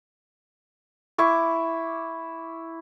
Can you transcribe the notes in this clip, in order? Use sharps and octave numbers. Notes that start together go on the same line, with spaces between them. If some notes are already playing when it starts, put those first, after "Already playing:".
E4 C#6 D6